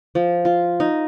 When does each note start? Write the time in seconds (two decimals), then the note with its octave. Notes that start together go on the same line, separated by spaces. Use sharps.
0.15 F3
0.45 F4
0.80 D#4